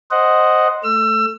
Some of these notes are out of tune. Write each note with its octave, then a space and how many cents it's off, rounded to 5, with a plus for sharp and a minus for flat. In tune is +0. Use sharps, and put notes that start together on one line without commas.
C5 +0 D#5 +0 F#5 +0
A3 +0 E6 +30